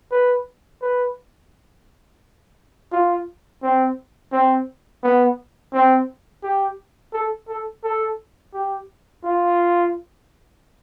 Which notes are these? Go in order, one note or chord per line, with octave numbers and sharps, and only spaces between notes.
B4
B4
F4
C4
C4
B3
C4
G4
A4
A4
A4
G4
F4